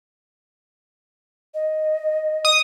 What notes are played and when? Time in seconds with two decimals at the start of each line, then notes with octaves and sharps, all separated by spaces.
1.54 D#5
2.45 D#6